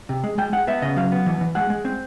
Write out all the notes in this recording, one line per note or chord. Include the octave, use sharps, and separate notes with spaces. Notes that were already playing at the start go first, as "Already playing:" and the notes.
C3
G#3
G#3 G5
G#3 F#5
B3 E5
C#3 D#5
F#3 F5
B3
E3
E3
G#3 F#5
G#3
C4